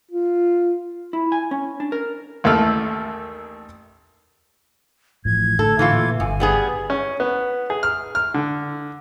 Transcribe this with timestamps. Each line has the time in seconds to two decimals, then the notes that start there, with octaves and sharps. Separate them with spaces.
0.12 F4
1.13 E4
1.32 G#5
1.51 C#4
1.80 D4
1.92 A#4
2.44 A1 D#2 A3 A4 F6
5.25 A1 A2 F3 G#6
5.59 A2 D3 A4
5.79 D3 E3 A3 F4
5.93 A#2
6.20 G1 F#2 G#5
6.40 G3 B3 G#4
6.90 C#4
7.20 B3
7.70 G#4
7.83 F6
8.15 F6
8.34 D3